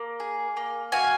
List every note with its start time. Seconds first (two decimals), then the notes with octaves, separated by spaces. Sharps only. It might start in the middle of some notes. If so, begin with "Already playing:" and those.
Already playing: A#3
0.20 G#4
0.57 A#3
0.92 F#4 F5 G#5